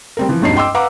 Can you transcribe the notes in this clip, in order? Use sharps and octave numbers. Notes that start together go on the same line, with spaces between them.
G3 C4 A#4
E3 F3
E1 B1 G2 C#4 D#4 C7
D#5 G5 C6 D6 E6
B4 F5 F#5 A#5 D6